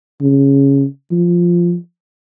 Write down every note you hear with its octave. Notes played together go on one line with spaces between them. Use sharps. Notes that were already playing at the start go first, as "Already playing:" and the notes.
C#3
F3